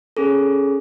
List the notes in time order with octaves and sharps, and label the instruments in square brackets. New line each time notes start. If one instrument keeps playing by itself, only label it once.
[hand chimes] C#4 G#4 A4